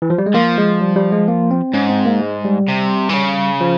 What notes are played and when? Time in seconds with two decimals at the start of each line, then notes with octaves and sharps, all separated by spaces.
0.02 E3
0.10 F3
0.18 G3
0.26 G#3
0.34 F3 A#3
0.57 G#3
0.81 G3
0.96 G3
1.12 G#3
1.28 A#3
1.51 C4
1.73 G#2 C#4
1.89 C4
2.05 A#3
2.21 G#3
2.44 G3
2.68 C3
3.09 E3
3.13 C#3
3.61 F3